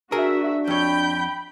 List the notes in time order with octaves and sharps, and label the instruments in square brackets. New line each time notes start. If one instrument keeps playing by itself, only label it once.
[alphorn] D4 [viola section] F#4 E5 [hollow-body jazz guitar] G#4 A#4
[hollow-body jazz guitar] F2 C#5 [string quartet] G5 G6 [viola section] B5